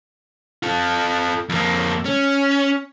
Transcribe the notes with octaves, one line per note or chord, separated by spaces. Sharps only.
F4 A4
F2 A#3
C#4